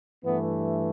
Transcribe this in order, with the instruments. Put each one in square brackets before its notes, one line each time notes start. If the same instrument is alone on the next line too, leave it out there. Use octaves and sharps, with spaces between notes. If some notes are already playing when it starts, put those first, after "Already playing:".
[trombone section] G2 E3 A3 B3